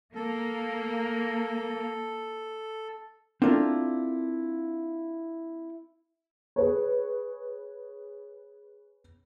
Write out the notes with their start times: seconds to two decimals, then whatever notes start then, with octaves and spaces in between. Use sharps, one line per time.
0.15 A#3 A4
3.42 C4 D4 E4 F4 A4 A#4
6.56 G#4 B4 C#5